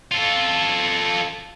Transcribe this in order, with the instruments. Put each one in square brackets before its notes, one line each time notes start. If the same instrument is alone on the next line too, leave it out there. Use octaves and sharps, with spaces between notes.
[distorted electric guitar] F4 A4